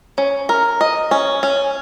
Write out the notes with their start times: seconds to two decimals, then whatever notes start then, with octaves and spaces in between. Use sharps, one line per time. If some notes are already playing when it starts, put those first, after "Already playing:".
0.18 C#4
0.49 A#4
0.81 D#5
1.11 C#4
1.43 C#4